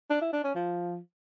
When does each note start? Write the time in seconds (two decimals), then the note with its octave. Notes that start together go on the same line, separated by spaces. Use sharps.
0.10 D4
0.21 E4
0.33 D4
0.44 C#4
0.55 F3